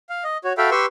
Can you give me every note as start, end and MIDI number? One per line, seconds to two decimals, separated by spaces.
0.09 0.24 77
0.24 0.37 75
0.44 0.53 66
0.44 0.53 73
0.58 0.70 66
0.58 0.70 69
0.58 0.70 76
0.58 0.70 77
0.58 0.70 79
0.58 0.70 83
0.71 0.86 67
0.71 0.86 71
0.71 0.86 84
0.71 0.86 85
0.71 0.86 88